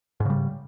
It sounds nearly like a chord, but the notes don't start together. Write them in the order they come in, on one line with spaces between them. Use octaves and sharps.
G#2 C#3 G3